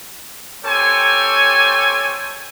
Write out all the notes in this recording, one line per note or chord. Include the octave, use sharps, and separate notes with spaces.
C4 G4 A4 C#5 G#5